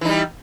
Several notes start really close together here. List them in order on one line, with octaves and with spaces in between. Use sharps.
E3 D#4 G3